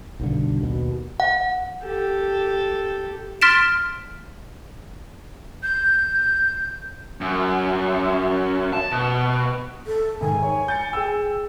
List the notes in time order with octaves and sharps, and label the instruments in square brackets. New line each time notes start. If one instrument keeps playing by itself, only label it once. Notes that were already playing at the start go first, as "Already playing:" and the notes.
[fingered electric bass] B1 G2 D3
D#2 B2
[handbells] F#5
[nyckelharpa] G4 A4
[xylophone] C6 F6 A6 B6 D7 E7
[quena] G6
[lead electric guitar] F#2
A5
B2
[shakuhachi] A4
[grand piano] G#2 D#3 [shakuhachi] G#5
[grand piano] C#5
G6 A6 C#7
G#4 G5 E6